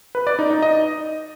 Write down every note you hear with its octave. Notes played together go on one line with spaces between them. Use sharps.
B4
D5
D#4
D#4
D#5